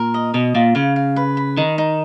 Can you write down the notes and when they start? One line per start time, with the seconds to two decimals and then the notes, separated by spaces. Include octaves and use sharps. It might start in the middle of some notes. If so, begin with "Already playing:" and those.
Already playing: A#2 A#4
0.14 D#5
0.34 B2 D#5
0.55 A#2 F4
0.75 C#3 F5
0.96 F5
1.16 B4
1.37 B5
1.57 D#3 D#4
1.78 D#4